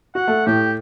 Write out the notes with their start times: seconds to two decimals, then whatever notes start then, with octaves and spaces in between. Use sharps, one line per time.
0.15 F#4 F#5
0.28 A3
0.47 A2 G4